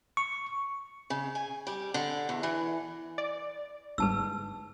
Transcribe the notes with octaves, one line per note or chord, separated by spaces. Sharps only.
C#6
C#3
G#5
G3
D3
E2
E3
D5
G1 G#2 B4 A5 E6